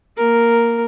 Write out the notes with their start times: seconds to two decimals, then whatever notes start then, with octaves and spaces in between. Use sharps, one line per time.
0.17 A#3 A#4